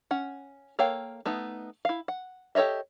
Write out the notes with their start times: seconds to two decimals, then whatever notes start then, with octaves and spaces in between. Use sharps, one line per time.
0.11 C#4 F#5
0.79 A#3 A4 C#5 F5 G5
1.25 A3 B3 D#4
1.85 E4 F5
2.08 F#5
2.55 G4 A4 C#5 D#5 E5